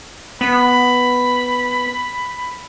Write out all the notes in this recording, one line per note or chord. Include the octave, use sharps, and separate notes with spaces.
B3 B5